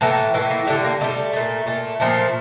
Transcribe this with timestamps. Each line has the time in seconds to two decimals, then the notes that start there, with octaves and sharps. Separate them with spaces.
0.01 A2 E3 A3 A#3
0.34 A2 E3 A3 A#3
0.51 A#3
0.67 D3 G3 A3
0.84 A#3
1.01 D3 G3 A3
1.33 A#2 A3
1.66 A#2 A3
2.00 A#2 F3 A3